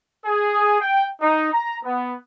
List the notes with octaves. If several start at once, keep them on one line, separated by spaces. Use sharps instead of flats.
G#4
G5
D#4
A#5
B3